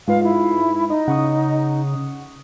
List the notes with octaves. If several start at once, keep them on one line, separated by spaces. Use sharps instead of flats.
G#2 G#3 F4 B4 F5
E4
D#4 D#5
C#3 F#5 C#6 D#6